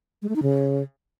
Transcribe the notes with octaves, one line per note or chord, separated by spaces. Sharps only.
G#3
A3
D#4
C#3